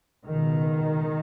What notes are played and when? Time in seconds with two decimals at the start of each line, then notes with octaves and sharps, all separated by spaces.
0.25 C#2 B2 D#3